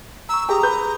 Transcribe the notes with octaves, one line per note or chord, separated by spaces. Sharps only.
A#5 C#6 E6
G4 G#4 A#5 D#6
B4 G6